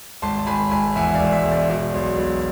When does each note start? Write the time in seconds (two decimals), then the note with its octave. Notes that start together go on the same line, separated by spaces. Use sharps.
0.22 G#1 A5 C6
0.38 A5
0.47 G#1 G#5 B5
0.71 G#1 G#5 B5
0.96 E2 E5 G#5
1.11 E5
1.14 D5 F5
1.21 E1
1.32 E5
1.45 E1
1.52 D5
1.69 B2 D5
1.94 B1
2.18 B1